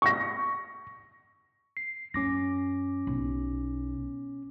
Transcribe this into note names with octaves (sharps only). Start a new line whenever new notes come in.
C#6 A#6
C7
F#2 C#4 D6 A#6
B1